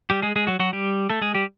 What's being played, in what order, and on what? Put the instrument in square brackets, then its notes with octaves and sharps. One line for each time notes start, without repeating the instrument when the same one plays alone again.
[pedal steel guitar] G3 G4
G#3 G#4
G#3 G#4
F#3 F#4
F#3 F#4
G3 G4
A3 A4
G#3 G#4
G3 G4